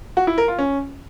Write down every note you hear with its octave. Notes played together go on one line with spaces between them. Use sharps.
F#4
E4
A#4
F4
C#4